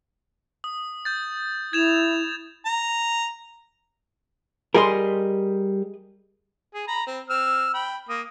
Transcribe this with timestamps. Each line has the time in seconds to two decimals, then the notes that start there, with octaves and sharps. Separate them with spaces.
0.64 D#6
1.05 G6 A6
1.73 E4 G#6 E7 F7
2.66 A#5
4.74 G3 G4 G#4 A#4 D#5 C6
6.74 G#4
6.88 A#5 B5
7.07 C4
7.30 C4 E6 F6
7.74 G5 B5
8.09 A#3 D#6